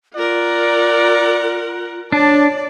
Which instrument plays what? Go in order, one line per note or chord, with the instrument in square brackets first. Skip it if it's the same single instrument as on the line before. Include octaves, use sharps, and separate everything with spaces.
[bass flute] F4 [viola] A#4 F#5 [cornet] D5
[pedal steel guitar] D4 [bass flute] C#5 [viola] D5 [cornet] A5